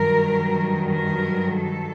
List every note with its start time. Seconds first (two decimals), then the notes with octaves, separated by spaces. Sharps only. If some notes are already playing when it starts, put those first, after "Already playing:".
Already playing: G2 D#3 F#3 A#4
0.89 A#4
1.55 A4